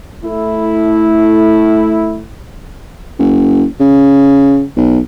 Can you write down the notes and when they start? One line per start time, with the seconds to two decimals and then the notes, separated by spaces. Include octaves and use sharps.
0.24 A3 E4
3.19 F#1
3.80 C#3
4.77 B1